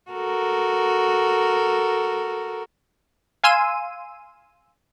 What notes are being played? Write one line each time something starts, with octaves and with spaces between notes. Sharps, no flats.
F#4 A4 A#4
F5 G#5 C6 E6 D#7